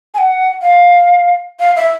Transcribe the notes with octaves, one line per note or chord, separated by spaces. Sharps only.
G#5
F#5
F5
F5
E5